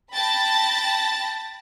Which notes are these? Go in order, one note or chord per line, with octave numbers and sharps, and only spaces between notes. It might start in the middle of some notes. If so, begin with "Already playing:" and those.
G5 A5 B5 A6 A#6